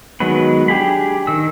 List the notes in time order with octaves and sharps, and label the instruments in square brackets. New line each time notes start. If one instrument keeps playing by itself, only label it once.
[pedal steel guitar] D#3 F#3 G#3 B3 B4
D4 G4 G#4 B5
D#3 E6